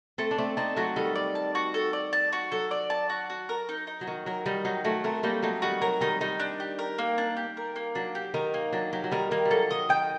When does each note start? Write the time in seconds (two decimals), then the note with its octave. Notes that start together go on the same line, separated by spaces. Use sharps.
0.18 A3 C4 A4
0.31 D4
0.38 A3 C4 D5
0.57 C4 D#4 A5
0.76 F#3 A3 F#4
0.96 D#3 G3 A4
1.15 D5
1.35 A5
1.55 F#4
1.74 A4
1.93 D5
2.13 A5
2.33 F#4
2.52 F#3 A4
2.71 D5
2.90 A5
3.10 F#4
3.30 F#4
3.49 A#4
3.69 D#4
3.87 D#4
4.01 F#3
4.07 D#3 F#4
4.26 F#3 A#4
4.46 D#3 G3 D#4
4.65 F#3 D#4
4.84 F#3 A3 F#4
5.04 A3 C4 A#4
5.23 G3 A#3 D#4
5.43 F#3 A3 D#4
5.62 D#3 G3 F#4
5.82 F#3 A#4
6.01 D#3 G3 D#4
6.21 D#3 G3 D#4
6.40 D4
6.60 G4
6.79 A#4
6.98 A#3
7.18 D4
7.37 G4
7.57 A#4
7.76 A#3
7.95 F#3 D4
8.15 G4
8.34 D#3 A#4
8.54 A#3
8.73 F#3 D4
8.93 F#3 G4
9.04 F#3
9.11 D#3 G3 A#4
9.31 D#3 A#3
9.45 G3
9.51 F#3 A4
9.71 D#3 D#5
9.89 D#3 G5